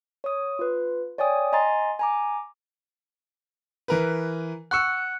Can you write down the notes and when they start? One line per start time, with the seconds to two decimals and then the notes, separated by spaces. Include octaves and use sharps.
0.24 C#5 D#6
0.59 F4 B4
1.18 C#5 D5 G5 G#5 D#6
1.52 D#5 G#5 A#5 C6 A6
1.99 G#5 A#5 D6
3.88 E3 A#4 B4
4.71 F#5 C#6 E6 F#6 C#7